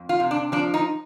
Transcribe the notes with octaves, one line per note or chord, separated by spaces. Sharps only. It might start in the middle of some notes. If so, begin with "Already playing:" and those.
Already playing: F2
F4
C3
D4
F3 D4
D#4